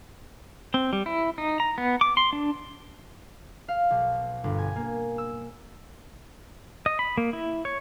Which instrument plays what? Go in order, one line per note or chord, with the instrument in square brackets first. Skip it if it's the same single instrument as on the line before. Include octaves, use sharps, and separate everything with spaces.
[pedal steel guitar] C4
G3
E4
D#4
A#5
B3
D6
C6
D4
[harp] F5
B1
G1
G#5
A#3
E6
[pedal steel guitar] D#5
B5
A#3
E4
C#5